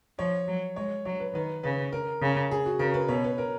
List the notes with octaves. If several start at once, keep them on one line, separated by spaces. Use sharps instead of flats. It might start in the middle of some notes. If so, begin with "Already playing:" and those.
F3 C#5
F#3
G#3 C#5
F#3 C#5
B4
D#3 B4
C#3 B4
A#4
C#3
G#4
F#4
C#3 A#4
B4
B2 C#5
B4
A#4